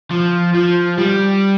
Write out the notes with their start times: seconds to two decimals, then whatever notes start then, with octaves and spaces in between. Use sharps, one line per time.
0.11 F3
0.54 F3
0.98 G3